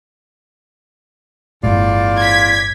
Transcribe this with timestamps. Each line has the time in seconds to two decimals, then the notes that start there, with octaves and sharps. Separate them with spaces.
1.63 G1 E2 A2 F4 D5
2.20 G#6 B6